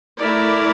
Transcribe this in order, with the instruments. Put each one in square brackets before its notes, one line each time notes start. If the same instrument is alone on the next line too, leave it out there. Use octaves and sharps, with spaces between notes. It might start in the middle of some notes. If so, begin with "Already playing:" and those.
[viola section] A3 E4 A#4 D5